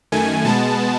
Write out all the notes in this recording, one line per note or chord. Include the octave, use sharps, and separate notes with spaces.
F#2 D#3 A3 G#5
B2 G#3 B3 A5